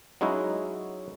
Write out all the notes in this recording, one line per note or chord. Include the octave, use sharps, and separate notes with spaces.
F#3 G#3 C#4 D#4 E4 F#4